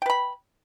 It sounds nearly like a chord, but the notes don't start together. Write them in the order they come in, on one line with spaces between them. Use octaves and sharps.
G5 B4 B5